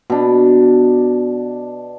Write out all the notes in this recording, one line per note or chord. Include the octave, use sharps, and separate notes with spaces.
B2 D4